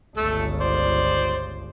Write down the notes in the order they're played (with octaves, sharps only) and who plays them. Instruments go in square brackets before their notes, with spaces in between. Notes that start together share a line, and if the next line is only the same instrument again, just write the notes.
[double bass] G1 C#2 [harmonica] A3 A4
[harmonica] C5 D5